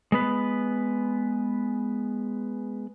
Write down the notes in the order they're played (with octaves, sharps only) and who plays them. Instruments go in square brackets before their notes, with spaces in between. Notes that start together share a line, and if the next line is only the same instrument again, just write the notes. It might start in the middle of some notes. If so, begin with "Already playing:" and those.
[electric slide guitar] G#3 B3 B4